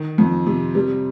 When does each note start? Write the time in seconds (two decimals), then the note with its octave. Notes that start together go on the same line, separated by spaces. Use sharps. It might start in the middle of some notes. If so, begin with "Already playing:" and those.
Already playing: D#3
0.18 F2
0.47 C3
0.75 G3